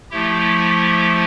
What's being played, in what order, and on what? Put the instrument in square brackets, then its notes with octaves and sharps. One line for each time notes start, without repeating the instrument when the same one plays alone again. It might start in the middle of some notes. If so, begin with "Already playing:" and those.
[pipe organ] F3 A3 E4 G4